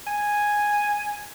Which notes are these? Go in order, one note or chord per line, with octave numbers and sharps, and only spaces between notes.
G#5